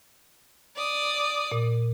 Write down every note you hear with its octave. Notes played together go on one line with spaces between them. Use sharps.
D5 D#6
A#2